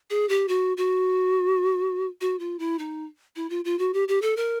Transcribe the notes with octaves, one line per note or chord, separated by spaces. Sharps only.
G#4
G4
F#4
F#4
F#4
F4
E4
D#4
E4
F4
F4
F#4
G4
G4
A4
A#4